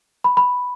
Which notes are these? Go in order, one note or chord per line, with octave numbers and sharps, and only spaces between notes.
B5
B5